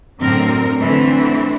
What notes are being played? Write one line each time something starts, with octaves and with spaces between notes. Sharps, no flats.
F#2 A2 D3 C4 A#4
D3 E3 A3 C4